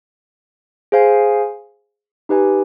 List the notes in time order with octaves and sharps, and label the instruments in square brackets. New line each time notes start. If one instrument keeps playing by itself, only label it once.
[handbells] G#4 C5 F5 G#5
D#4 G4 B4 D#5 G#5